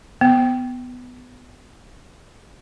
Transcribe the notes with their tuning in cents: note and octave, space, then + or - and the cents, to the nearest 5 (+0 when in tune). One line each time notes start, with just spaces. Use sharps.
B3 +15